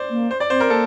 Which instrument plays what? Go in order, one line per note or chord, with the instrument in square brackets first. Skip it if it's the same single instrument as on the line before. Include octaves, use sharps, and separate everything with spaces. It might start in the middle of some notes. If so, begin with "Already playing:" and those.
Already playing: [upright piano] C5 D5
[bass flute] A#3
[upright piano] C5
D5
[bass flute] C4 [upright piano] C5
[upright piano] A#4
[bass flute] A#3 [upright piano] A4